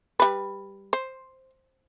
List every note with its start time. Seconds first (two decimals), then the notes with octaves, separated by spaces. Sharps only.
0.20 G3 B4
0.93 C5